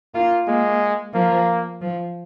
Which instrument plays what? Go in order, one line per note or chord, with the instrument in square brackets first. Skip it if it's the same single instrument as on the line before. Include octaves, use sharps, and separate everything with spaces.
[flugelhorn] A#3 [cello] F4
[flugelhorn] G#3 [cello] A#3
[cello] F3 [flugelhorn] A#3
[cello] F3